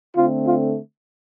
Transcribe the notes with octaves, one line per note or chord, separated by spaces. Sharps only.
D3 A3 C4 F4
F4